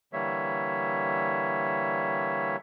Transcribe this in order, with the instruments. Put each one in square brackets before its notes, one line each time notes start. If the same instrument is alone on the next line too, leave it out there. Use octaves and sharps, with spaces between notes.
[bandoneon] D3 E3 G3 A#3 C#5 E5